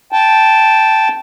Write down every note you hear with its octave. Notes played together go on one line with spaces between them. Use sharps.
G5 A5